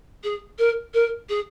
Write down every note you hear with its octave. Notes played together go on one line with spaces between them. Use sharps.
G#4
A#4
A#4
G#4